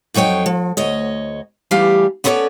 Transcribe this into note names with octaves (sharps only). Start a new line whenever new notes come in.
F2 F#3 D#4 C#5 G5
F3
D2 C#5 D#5
E2 E3 G3 A3 G4 F5
B3 C#4 E4 A4 C#5 D5